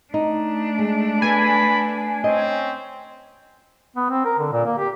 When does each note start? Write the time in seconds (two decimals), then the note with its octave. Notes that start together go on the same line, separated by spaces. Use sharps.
0.14 A3 D4 D#4
0.79 G#3
1.22 B3 A4 G#5 B5
2.24 C4 C#4 D#5
3.96 B3
4.10 C4
4.25 A#4
4.38 D3
4.52 A#2
4.65 A#3
4.78 G4